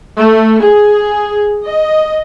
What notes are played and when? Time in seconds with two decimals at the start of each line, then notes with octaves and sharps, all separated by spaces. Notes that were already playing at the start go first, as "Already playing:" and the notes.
0.16 A3
0.59 G#4
1.67 D#5